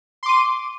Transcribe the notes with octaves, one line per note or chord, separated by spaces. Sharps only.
C6 D6 D#7